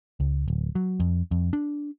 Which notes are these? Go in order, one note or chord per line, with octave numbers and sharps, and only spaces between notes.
C#2
D1
F#3
F2
F2
D4